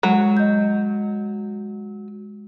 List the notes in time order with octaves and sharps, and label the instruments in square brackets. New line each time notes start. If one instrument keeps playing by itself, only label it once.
[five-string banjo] F#3 [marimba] G#3
[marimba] D#5 G6